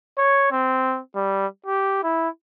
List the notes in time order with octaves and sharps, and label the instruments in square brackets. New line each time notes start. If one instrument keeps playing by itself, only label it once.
[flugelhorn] C#5
C4
G3
G4
E4